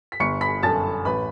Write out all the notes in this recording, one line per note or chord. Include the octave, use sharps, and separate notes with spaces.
B6
G1 C#6 C#7
B5 B6
F#2 D3 A5 A6
A1 B4 B5